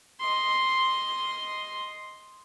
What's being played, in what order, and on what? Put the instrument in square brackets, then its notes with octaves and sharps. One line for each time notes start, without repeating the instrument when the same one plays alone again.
[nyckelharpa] D#5 C6